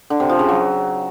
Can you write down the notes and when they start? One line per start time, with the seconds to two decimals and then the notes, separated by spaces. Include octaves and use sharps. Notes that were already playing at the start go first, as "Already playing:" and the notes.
0.10 D3
0.20 C3
0.29 F3
0.39 C#3
0.49 F#3